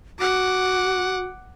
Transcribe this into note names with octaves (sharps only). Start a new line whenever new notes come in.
F#4 F#5 D6